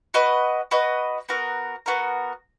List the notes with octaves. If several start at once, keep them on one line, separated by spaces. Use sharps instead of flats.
F#4 B4 D#5
F#4 B4 D#5
B3 F#4 A#4
B3 F#4 A#4